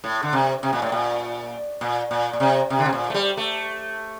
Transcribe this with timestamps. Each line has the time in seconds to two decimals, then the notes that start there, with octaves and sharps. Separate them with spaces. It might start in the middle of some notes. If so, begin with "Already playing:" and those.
0.04 A2
0.23 D3
0.33 C3
0.63 C3
0.73 A#2
0.82 A2
0.92 A#2
1.81 A#2
2.11 A#2
2.33 A#2
2.40 C3
2.70 C3
2.79 D3
2.86 C3
2.93 A#2
3.10 A3
3.14 G3
3.37 A3